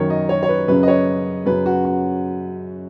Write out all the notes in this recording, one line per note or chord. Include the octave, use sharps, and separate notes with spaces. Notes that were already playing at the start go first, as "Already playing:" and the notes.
Already playing: F#2 D#3 C#5
D#5
C#5
C#5
B4
F#2 C#3 B4
D#5
C#5
F#2 C#3 B4
F#4
F#4